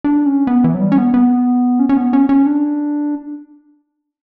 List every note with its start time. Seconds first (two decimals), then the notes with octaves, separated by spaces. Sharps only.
0.04 D4
0.26 C#4
0.47 B3
0.64 E3
0.74 F#3
0.81 G3
0.92 C#4
0.98 B3
1.14 B3
1.79 C#4
1.89 C#4
1.97 B3
2.13 C#4
2.29 C#4
2.46 D4